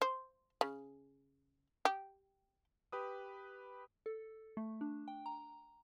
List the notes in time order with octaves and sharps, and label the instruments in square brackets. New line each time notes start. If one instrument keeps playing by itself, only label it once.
[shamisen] C5
C#3
G4
[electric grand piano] G4 B4 D#6
[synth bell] A4
A3
D4
G5
A#5